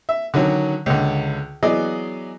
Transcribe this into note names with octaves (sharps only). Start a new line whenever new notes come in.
E5
D3 D#3 F#3 C#4
C#2 D3
E3 F#3 B3 G#4 D5 D#5